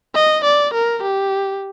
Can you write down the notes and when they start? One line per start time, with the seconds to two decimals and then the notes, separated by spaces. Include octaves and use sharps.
0.15 D#5
0.45 D5
0.74 A#4
1.03 G4